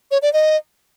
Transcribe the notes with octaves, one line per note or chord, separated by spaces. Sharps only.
C#5
D5
D#5